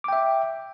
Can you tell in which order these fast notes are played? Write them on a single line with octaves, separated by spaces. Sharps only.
D6 G5 E5